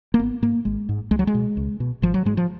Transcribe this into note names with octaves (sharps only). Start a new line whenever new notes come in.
A#3
G#1 B3
G#2 A#3
G#1 G#3
G#2
C#2 G#3
F#3
G#3
B2
C#2
B2
G#1 F3
F#3
G#2 G#3
F3